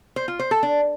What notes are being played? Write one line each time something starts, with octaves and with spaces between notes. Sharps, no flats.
C5
F4
C5
A4
D4